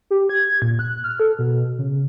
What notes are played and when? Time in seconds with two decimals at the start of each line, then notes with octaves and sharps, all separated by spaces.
0.11 G4
0.29 G#6
0.62 A#2
0.79 F#6
1.04 F6
1.20 A4
1.39 B2
1.79 C#3